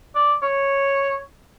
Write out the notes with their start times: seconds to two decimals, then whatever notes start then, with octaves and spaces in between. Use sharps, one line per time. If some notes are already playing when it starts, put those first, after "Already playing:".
0.15 D5
0.43 C#5